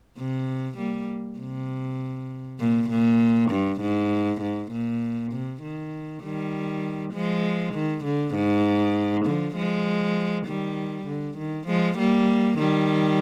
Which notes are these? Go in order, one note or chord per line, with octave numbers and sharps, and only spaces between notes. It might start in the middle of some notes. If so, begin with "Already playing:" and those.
C3
G3 A#3
C3
A#2
A#2
G2
G#2
G#2
A#2
C3
D#3
D#3 G3
F3 G#3
D#3
D3
G#2
D3 F3
F3 G#3
D#3 G3
D3
D#3
F3 G#3
G3 A#3
D#3 G3